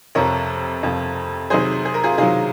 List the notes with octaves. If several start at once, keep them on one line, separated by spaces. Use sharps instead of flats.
F2 C3 F3 A#4 C#5
F2 C3 F3
C3 D#3 F#3 G#4 C5
G#4
A#4
F4 G#4
C3 D#3 F#3 F4 G#4